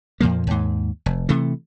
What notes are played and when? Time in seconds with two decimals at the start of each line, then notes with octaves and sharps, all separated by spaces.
0.21 F2 A#2 F3 A#3
0.47 D#2 G#2
1.06 F1
1.29 C3 E3 A3